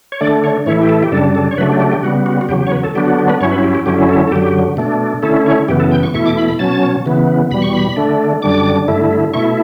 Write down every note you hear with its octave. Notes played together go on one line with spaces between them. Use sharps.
C#5
D3 A3 D4 D5
C#5
A2 E3 A3 E4 C#5
G4
A4
G4
F#2 C#3 G3 D4 A4
A4
C#5
C#3 F#3 A3 D4 B4
G4
G4
G4
C#3 G3 B3 F#4
F#4
F#4
E2 C#3 F#3 G4
G4
C#5
B4
A4
D3 F#3 B3 D4 G4
F#4
G4
B4
G2 F#3 C#4 E4 C#5
B4
G4
G4
F#2 D3 F#3 C#4 E4 G4
A4
A4
F#2 D3 F#3 G4
B2 A3 D4
D3 A3 C#4 E4 A4
C#5
F#2 C#3 E3 B3 G4
A4
G5
C#6
E2 B2 A3 E4 C#6
D6
B5
B5
B2 F#3 C#4 A5
C#3 E3 B3
E2 B2 G3 B5
C#6
B5
D3 A3 D4
F#2 D3 G3 D4 D6
G2 D3 A3 E4
B2 A3 E4 C#6